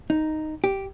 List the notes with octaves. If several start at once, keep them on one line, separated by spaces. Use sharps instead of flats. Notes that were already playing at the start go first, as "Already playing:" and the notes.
D#4
G4